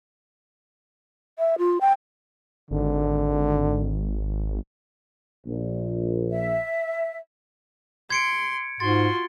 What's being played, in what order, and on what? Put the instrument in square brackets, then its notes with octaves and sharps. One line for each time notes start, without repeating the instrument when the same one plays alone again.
[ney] E5
F4
G5
[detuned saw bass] G#1 [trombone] D3
[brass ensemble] A#1
[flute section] E5
[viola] C6 [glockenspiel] G#6 C#7 D7
[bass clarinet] G#2 [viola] F4 F#4 [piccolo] C6 [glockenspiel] A6